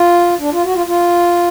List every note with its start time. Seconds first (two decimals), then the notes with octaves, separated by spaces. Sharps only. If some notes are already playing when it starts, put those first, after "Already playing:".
Already playing: F4
0.40 D4
0.52 F4
0.64 F#4
0.74 F4
0.86 F4